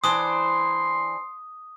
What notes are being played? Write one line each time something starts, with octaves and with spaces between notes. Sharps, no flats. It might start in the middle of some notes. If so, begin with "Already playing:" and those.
E3 D4 C5 C6 D#6